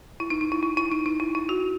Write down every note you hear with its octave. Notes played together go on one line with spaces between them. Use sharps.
E4
D#4
D#4
E4
E4
E4
D#4
D#4
E4
E4
F#4